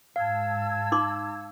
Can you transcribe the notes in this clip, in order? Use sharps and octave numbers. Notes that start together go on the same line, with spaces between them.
G#2 F5 A5 E6 G#6
D#4 C6 D6